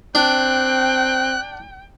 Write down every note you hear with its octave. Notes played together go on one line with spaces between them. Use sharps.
C4 D4 G5 F#6